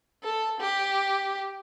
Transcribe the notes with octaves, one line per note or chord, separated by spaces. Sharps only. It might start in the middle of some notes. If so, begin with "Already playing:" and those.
A4
G4